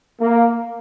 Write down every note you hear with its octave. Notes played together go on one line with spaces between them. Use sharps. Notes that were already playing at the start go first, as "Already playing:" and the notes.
A#3